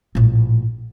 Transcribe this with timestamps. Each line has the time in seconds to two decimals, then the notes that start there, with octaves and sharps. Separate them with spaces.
0.15 A#1 A2